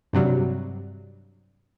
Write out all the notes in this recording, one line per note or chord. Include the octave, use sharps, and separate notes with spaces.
G2 C3 F#3 G3